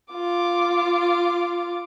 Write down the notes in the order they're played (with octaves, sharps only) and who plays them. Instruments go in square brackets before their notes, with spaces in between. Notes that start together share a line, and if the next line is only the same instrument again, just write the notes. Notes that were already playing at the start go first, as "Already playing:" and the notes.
[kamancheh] F4 D6